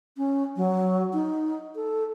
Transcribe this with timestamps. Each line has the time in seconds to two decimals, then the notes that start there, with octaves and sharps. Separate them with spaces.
0.17 C#4
0.56 F#3
1.13 D#4
1.76 A4